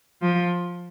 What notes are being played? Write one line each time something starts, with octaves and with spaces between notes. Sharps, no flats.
F3